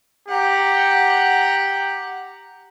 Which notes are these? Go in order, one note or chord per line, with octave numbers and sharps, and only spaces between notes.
G4 F#5 A#5